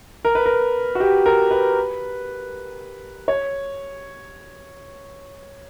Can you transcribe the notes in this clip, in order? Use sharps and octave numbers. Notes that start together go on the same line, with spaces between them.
A#4
B4
A#4
F#4
G4
A#4
B4
C#5